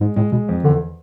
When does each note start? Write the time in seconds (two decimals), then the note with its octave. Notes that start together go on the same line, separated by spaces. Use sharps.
0.01 G#2 G#3
0.16 A2 G#3
0.32 B2 G#3
0.49 F2
0.64 E2 D3